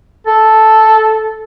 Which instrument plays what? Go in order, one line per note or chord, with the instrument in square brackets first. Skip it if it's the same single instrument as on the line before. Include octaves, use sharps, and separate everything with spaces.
[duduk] A4